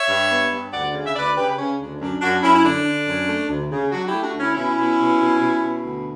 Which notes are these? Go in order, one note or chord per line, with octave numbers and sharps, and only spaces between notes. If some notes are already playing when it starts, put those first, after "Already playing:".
Already playing: C#5 E5
G2
B3
G2
D2 D5 F#5
C#3
E5
D2 B4 D5
C#3 G4 B4
C#3 C#4
D2 D4
F#2 D4
F#2 D4 F#4
F#2 C#4 E4
E4
D3 D4
D3
F#2
A3
D2
C#3
F#3 D4 F#4
A3 E4 G4
D4 F#4
D2
C#4 E4
B2 C#4 E4
B2
B2
B2
B2
B2
D2